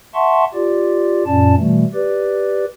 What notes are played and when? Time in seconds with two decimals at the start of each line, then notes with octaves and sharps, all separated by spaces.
0.14 E5 F#5 A5 C6 C#6
0.54 F4 G4 D5
1.26 F#2 A#2 C#4 D5 A5
1.57 B2 E3 G3 A3
1.94 G4 B4 D5